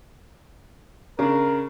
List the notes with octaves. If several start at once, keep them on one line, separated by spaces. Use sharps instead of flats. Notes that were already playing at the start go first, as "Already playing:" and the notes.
C#3 D4 A#4